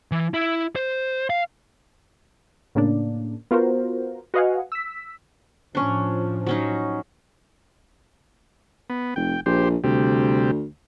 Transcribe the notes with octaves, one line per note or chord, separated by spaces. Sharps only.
E3
E4
C5
F5
A2 C#3 A#3 D4
B3 F4 F#4 A#4 C5
F#4 B4 D#5 F5 F#5 G#5
E6 B6
A2 F3 C#4 D4
F#3 C#4 D#4
B3
F1 G5
A#1 G4 C5
D2 C3 G3